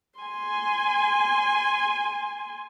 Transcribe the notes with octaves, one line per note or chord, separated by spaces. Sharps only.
G#5 C6